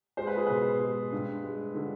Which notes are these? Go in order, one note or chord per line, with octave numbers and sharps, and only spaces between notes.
G#3 C5
B4
G#4
B2 B4
G#3
G2
G#3
D3